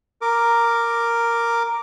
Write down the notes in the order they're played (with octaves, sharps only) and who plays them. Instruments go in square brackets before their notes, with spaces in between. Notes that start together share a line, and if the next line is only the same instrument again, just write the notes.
[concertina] A#4 D6